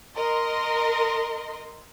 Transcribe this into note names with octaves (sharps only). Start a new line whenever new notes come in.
A#4 D#5 C6